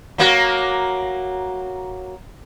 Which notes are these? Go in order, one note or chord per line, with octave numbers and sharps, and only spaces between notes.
F#3 A#3 F#4